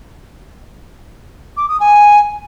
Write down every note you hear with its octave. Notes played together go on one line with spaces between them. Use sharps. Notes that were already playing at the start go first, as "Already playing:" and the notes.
D6
D#6
G#5